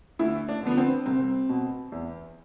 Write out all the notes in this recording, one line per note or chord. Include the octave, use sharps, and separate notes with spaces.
D2 E4
D4
D3 F3 B3
C4
C2 C4
B2
E2